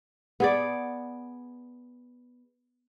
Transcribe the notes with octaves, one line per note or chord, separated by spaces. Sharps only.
B3 G#4 D5